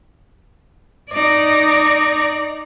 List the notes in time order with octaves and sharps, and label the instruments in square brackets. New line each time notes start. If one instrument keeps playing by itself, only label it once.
[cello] D#4 D5